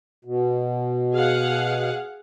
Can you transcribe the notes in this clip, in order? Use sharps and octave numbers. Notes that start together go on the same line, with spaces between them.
B2
G#4 F5 F#5